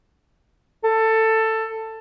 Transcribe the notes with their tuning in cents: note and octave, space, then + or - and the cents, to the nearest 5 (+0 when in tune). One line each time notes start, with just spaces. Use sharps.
A4 +15